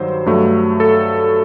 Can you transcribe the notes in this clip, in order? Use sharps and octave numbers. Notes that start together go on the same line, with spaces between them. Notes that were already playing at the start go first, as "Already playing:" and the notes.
Already playing: G2 D#3 F#3 C5
G2 F#3 A3
A4